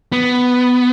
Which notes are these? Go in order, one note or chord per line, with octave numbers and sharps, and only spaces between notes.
B3